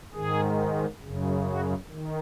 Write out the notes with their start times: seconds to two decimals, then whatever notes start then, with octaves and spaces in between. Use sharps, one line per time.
0.14 G#2 D#3 G#4
1.03 F#2 C#3
1.48 F#4
1.91 D#3